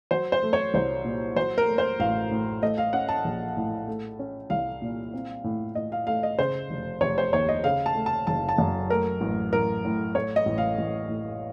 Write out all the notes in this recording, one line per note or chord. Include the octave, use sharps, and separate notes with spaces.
F#3 C5
C5
A3
C#5
C2 C5
A#2
F#3 C5
A#4
A3
C5
A1 F5
A2
A3 D#5
F5
C#4 F#5
A5
A#1
A2
A3
C#4
C2 F5
A#2
C4
A2
A2 D#5
F5
A3 F5
D#5
C#3 C5
F1
F1 C#5
C5
D#2 C#5
D#5
C#3 F5
A5
A3
A5
F#1 A5
A5
F#2
A3 A#4
A1
A1 A#4
A2
A3 C#5
D#5
A1
F5
A1
A2